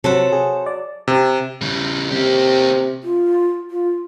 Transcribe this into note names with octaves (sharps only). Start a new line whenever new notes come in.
C3 F#3 A4 C5 F#5
G#4
D5
C3
C#3 G3
C3 A#3 G4
F4
F4